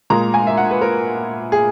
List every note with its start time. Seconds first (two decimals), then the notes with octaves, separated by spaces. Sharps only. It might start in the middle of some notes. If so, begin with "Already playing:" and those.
0.10 A#2 G#3 A#5
0.34 G#5
0.47 E5
0.57 F#5
0.71 B4
0.81 A#4
1.52 G#4